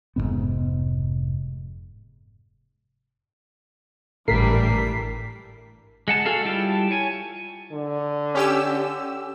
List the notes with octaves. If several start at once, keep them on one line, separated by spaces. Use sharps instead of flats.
F1 D#2 G#2 B3
G#1 A2 E3 G3 D4 A#4 B6 C7
G#3 F#5 A5
F#4 G#4 A4 F5
G3 E4 F4 G5 A5
C#5 G#5
D3
C#4 G4 E6